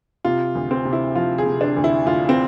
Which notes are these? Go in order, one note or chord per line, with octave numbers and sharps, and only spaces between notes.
C3 F4
D2
C4
C3
E4
F3 F4
G#4
C3
D4
D2
E4
D2 F4
C4